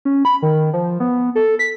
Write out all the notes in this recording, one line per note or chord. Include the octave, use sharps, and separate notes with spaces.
C#4
B5
D#3
F3
B3
A4
B6